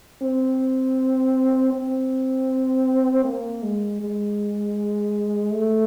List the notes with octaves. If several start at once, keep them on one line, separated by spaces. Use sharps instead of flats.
C4
C4
A#3
G#3
G#3
A3